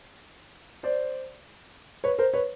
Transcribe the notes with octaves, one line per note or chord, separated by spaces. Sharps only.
C5 D5
B4 C#5
A#4 C5
B4 C#5